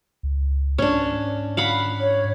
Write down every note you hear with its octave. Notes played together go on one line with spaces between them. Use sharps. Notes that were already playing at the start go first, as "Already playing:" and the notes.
C#2
G#2 C#4 D4
F5 F#5 B5
C#5